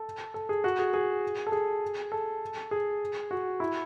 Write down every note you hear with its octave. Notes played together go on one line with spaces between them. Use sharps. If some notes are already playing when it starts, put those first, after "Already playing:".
Already playing: A4
A4
G#4
F#4
G#4
G#4
A4
G#4
A4
G#4
F#4
E4